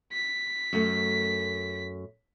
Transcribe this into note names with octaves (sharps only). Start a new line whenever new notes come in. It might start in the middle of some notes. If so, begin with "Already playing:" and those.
B6
F#2 A3